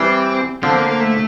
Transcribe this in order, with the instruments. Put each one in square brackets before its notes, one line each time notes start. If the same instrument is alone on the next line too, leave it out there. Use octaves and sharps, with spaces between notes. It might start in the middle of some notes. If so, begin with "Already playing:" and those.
Already playing: [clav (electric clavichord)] E3 G3 [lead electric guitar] C4
[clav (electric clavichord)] D3 F3 [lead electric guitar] C4
[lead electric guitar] A#3
A#3
A3